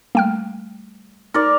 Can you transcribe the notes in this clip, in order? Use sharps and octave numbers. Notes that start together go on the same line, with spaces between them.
G3 A3 A#3 G5 F6
D#4 A#4 D5